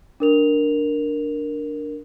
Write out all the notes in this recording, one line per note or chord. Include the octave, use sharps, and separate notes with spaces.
D4 A#4 F7